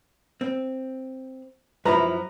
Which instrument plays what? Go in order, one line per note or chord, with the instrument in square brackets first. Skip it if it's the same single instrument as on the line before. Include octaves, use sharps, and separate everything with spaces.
[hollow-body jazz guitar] C4
[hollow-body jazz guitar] F#2 F3 E4 [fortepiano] B4 A#5